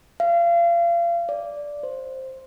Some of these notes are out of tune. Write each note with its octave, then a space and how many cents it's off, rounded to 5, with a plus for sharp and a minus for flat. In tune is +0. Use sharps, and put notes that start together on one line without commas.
F5 -35
D5 -10
C5 +5